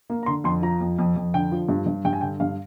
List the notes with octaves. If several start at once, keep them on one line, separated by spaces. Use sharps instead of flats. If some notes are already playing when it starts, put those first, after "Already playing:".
A#3
A#5
D3 C6
F2 C6
F3 A#5
F2
F2
F2
D3 G5
F3
G2
G2
G2 G5
G#5
D3 G5
G2 F5